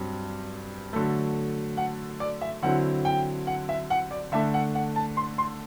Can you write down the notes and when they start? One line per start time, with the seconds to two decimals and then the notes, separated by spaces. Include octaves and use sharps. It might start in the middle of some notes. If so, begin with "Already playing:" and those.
Already playing: G2 F#3 C4
0.93 D3 F#3 A3
1.77 F#5
2.20 D5
2.42 E5
2.62 D3 F#3 C4 E4 F#5
3.05 G5
3.47 F#5
3.69 E5
3.90 F#5
4.11 D5
4.32 D3 A3 D4 E5
4.54 F#5
4.75 F#5
4.96 A5
5.17 C6
5.38 C6